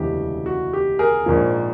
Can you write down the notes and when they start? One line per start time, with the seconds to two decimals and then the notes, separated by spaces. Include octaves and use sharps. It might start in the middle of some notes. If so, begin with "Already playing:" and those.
Already playing: E1 D2 C#3 E3 G#3 G4
0.46 F#4
0.73 G4
0.99 G#4 A#4
1.26 A#1 G#2 F3 A#3